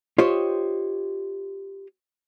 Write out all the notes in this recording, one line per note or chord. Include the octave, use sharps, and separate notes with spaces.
F4 G4 C5 C#5 D#5